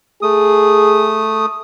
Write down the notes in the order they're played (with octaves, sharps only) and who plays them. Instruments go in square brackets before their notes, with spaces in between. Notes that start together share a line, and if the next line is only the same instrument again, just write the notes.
[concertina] A3 D#6 [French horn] G#4